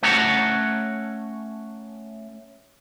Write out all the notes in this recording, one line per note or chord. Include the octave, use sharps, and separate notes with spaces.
A3 C#4 C#5 F#5 A5 A#5